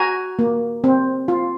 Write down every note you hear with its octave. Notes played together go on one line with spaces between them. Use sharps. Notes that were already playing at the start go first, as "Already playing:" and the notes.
Already playing: F#4 G#5 A#5
A#3
C4
F4